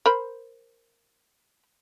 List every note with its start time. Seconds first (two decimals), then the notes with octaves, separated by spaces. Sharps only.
0.06 A#4 C5 B5